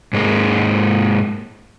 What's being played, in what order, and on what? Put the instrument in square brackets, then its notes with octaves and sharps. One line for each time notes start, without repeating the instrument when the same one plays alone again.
[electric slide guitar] G#2 G#3 A#3